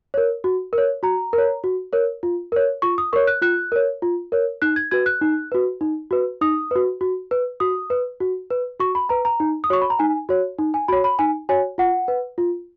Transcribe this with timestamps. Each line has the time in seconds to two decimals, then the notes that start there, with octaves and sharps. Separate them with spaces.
0.14 A#4 C#5
0.44 F#4
0.73 A#4 C#5
1.03 F#4 A#5
1.33 A#4
1.38 C#5
1.64 F#4
1.93 A#4 C#5
2.23 F4
2.52 A#4 C#5
2.82 F4 C#6
2.98 D#6
3.13 A#4 C#5 C#6
3.27 F#6
3.42 F4 F#6
3.72 A#4 C#5
4.02 F4
4.32 A#4 C#5
4.62 D#4 F#6
4.76 G#6
4.91 F#4 B4 G#6
5.06 F#6
5.21 D#4
5.52 F#4 B4
5.81 D#4
6.11 F#4 B4
6.41 D#4 D#6
6.71 F#4 B4
7.01 F#4
7.31 B4
7.60 F#4 D#6
7.90 B4
8.20 F#4
8.50 B4
8.79 F#4 C#6
8.95 B5
9.09 B4 A#5
9.25 A#5
9.40 D#4
9.64 D#6
9.70 F#4 C#5 C#6
9.81 B5
9.90 A#5
9.99 D#4 G#5
10.29 F#4 C#5
10.58 D#4
10.74 G#5
10.88 F#4 C#5 B5
11.04 B5
11.19 D#4 G#5
11.49 F#4 C#5 G#5
11.78 F4 F#5
12.08 B4
12.38 F4